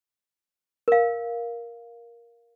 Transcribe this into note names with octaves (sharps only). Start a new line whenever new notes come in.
A#4 F5